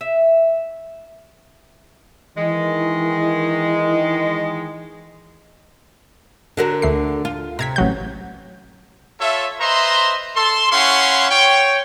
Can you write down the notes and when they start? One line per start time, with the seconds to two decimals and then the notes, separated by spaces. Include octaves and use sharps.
0.01 E5
2.35 D#3 E3 G#3
6.57 D3 F#4 A#4
6.82 D2 A3 C7
7.25 F4
7.59 C3 A#5 G#6 B6
7.76 A1 F#3 G6
9.21 F4 A4 C#5 E5
9.61 B4 C5 D#5 E5 A#5 C6
10.36 A4 C6
10.72 C#4 E4 F5 F#5 C6 C#6
11.31 C#5 G5